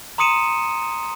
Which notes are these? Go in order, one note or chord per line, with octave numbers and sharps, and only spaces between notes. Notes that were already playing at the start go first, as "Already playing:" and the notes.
A#5 C6 D#6 C#7 D#7 E7